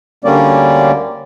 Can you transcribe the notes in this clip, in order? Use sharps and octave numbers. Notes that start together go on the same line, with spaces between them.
D2 D3 G3 A#3 C#4 D5